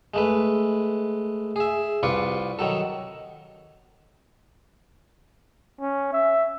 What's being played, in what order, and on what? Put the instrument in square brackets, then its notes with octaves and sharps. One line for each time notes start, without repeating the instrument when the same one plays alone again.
[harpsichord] G#3 A3 B4
G#4 E5
C2 F4 B4 D5 C#6
D#3 F#3 A4
[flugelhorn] C#4
E5